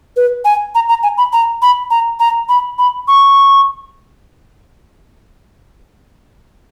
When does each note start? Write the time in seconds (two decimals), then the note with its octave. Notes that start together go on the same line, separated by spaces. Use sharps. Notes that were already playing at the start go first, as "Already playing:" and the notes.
0.16 B4
0.45 G#5
0.75 A#5
0.89 A#5
1.03 G#5
1.18 B5
1.33 A#5
1.62 B5
1.91 A#5
2.20 A#5
2.49 B5
2.79 B5
3.08 C#6